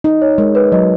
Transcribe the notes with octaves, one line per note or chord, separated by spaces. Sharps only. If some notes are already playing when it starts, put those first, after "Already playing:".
D#4
C#5
G#3 A#4
B4
F#3 D#5